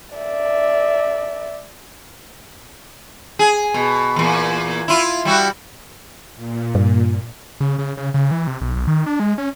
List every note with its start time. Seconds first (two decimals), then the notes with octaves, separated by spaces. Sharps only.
0.15 D5 E5
3.39 G#4
3.74 B2
4.16 E2 A#2
4.88 E4 F4
5.25 G3 E4 F#4
6.36 A#2
6.75 G2
7.60 C#3
7.79 C#3
7.97 C#3
8.14 C#3
8.31 E3
8.47 C3
8.61 B1
8.76 B1
8.87 D#3
9.06 D4
9.20 G#3
9.38 C#4